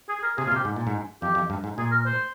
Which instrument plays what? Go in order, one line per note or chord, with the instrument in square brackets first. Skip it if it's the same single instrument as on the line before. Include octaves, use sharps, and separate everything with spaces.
[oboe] G#4
G#4
A#4
[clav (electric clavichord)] C3 [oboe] G#4
[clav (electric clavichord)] A#2 [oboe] F4
[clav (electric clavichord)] C3
[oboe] G4
[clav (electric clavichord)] G#2
A#2
G#2
[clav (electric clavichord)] F2 [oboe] G4
[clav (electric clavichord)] F2
G2
G#2
[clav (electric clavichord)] A#2 [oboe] G#4
[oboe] A#4
C5